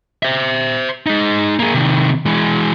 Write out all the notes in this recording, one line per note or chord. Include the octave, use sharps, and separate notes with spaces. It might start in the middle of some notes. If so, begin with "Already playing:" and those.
C5 E5
G#3 D#4
A#3 G#4
C3 D#3
E3 G#3